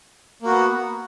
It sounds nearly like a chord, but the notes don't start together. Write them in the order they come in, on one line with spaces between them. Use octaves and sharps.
A#3 F#4 B3